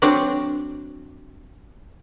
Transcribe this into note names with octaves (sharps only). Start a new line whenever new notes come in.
F#3 C4 D4 F#4 D5